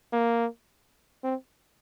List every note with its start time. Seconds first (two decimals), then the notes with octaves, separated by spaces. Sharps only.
0.13 A#3
1.23 C4